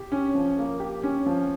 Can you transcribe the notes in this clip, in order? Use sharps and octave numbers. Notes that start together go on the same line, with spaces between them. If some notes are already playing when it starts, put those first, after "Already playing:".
Already playing: G4
C#4
F3
A#3
G4
C#4
F3